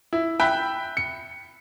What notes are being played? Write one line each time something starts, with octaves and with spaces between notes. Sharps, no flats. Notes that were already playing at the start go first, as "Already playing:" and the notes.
E4
E5 G5 B5 F#6
C#7